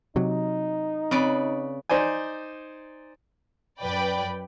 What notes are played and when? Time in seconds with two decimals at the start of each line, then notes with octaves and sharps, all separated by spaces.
0.16 C3 F#3 D#4
1.11 C#3 C4 B4 D5
1.89 D#4 C5 D5 G#5
3.82 F#2 B4 D5 G5 B5